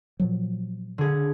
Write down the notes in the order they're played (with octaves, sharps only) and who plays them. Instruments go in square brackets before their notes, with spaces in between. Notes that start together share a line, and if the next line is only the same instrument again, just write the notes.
[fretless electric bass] A#2 F3 F#3
[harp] D3 G#4